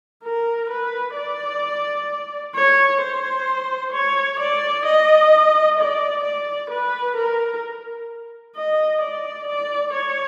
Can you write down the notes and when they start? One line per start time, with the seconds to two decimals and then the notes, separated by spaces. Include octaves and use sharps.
0.24 A#4
0.70 B4
1.16 D5
2.55 C#5
3.01 C5
3.93 C#5
4.40 D5
4.86 D#5
5.79 D5
6.24 D5
6.70 B4
7.16 A#4
8.56 D#5
9.02 D5
9.47 D5
9.94 C#5